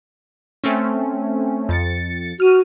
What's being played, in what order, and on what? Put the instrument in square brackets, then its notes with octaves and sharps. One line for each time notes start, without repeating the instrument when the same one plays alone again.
[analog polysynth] A3 C4 C#4
F2 A6 C#7
[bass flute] F#4 [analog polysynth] F6 D#7